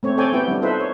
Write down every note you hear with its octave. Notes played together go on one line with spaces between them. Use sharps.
A3 C4 C#5
C4 A4 C#5 D5 G5 G#5
B3 E4 G4 G5
G3 D4
D#4 F4 A4 B4 C5 E5
C#5